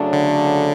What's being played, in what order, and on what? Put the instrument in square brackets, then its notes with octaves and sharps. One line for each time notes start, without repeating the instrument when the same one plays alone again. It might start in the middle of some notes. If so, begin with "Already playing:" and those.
Already playing: [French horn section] C#3 F#3 A3 D4
[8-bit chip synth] D3